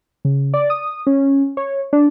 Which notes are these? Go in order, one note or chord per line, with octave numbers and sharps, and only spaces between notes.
C#3
D5
D#6
C#4
C#5
D4